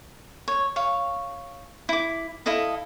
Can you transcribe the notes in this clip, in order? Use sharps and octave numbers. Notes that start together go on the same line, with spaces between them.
C#5
C#5 F5
E4 D6
E4 A4 D#5 F5